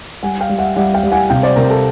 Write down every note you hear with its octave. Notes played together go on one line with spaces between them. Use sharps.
G3 F#5 G#5
F5 G5
G3
E5 F#5
G3 E5 F#5
F5 G5
G3
F#5 G#5
C3 F5 G5
C5 D5
C3 A#4
A4